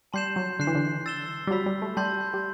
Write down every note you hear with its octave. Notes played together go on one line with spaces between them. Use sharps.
G3 A5 C6 G6 C7 E7
F#3
D3 F#6 C7 E7
E3
D3
E6 A6 E7 G7
G3
F#3 B5 E6 B6
G3
A3
G3 A5 C6 G6
G3